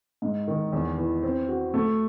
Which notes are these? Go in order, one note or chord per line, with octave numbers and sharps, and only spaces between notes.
G#2
D#3
E2
E3
C4
F#4
A3